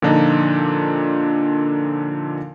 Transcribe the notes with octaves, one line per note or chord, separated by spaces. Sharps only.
A#2 D3 F3 D4 D#4